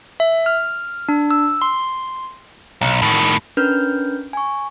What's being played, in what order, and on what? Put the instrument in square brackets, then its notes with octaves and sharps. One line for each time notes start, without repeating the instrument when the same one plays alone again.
[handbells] E5
F6
D4
E6
C6
[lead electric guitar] B1
A2 D#3
[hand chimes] C#4 D4 A#4 B4 F6 G6
G#5 C#6